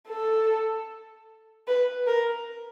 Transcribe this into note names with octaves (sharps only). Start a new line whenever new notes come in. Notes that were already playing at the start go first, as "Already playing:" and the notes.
A4
B4
A#4